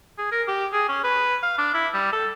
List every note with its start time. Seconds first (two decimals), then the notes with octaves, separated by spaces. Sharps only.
0.18 G#4
0.32 A#4
0.48 G4
0.73 G#4
0.89 C#4
1.04 B4
1.43 F5
1.58 D4
1.74 E4
1.94 G3
2.12 A4